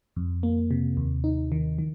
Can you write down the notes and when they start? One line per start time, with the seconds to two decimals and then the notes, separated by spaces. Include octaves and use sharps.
0.16 F2
0.43 A#3
0.71 C3
0.97 D#2
1.24 D#4
1.52 D#3
1.78 D#3